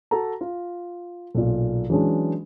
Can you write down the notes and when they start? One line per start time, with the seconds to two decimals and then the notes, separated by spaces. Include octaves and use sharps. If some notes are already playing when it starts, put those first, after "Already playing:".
0.11 F#4 A4 A#5
0.41 F4
1.35 B1 A#2
1.90 E3 F#3 G#3 C#4 D4